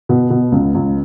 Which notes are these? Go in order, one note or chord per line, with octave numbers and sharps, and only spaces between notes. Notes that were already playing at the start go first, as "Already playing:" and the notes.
B2
B2
C#2
C#2